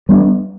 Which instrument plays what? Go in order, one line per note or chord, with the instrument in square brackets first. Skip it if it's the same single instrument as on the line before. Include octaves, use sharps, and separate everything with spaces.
[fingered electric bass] G3 B3 D4